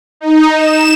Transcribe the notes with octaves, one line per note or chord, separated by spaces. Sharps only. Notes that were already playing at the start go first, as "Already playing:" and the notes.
D#4
E7